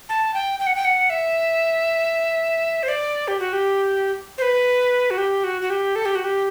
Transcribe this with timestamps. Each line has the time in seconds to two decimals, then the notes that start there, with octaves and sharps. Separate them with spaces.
0.09 A5
0.34 G5
0.60 G5
0.67 F#5
0.75 G5
0.85 F#5
1.10 E5
2.83 C5
2.88 D5
3.28 G4
3.40 F#4
3.53 G4
4.38 C5
4.42 B4
5.11 F#4
5.18 G4
5.44 F#4
5.62 F#4
5.70 G4
5.96 A4
6.05 G4
6.15 F#4
6.24 G4